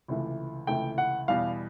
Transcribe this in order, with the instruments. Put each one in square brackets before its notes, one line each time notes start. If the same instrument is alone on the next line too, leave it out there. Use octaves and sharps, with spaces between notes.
[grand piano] C#2 C3 E3 A3
C#2 C3 E3 A3 G5
F#5
E2 B2 G3 F5